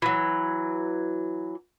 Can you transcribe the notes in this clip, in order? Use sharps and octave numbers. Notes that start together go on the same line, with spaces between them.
E3 F#3